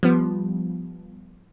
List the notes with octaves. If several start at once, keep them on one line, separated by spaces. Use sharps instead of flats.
F3 G3 B3